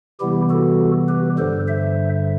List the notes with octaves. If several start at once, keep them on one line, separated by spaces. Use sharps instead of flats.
C3 E3 G3 B3 E4 G4
F#4 A4
G4 B4
G2 D3 G3 A4 C5
C5 E5